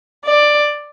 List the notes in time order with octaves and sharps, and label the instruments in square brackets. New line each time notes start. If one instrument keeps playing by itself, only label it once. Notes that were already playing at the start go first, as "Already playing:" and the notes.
[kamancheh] D5